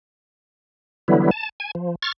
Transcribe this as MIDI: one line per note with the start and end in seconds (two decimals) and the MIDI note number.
1.08 1.31 50
1.08 1.31 52
1.08 1.31 54
1.08 1.31 55
1.08 1.31 59
1.08 1.31 64
1.31 1.49 81
1.60 1.71 80
1.75 1.95 53
2.03 2.12 85
2.03 2.12 89
2.03 2.12 93